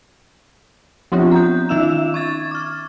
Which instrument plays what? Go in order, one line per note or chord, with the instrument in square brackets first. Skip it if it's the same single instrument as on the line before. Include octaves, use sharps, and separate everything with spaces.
[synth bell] F3 B3 C4 D4 F4
A#5 G6
D#3 C#4 D#4 E5 E6 E7
C#6 G#6 A6
D6 F6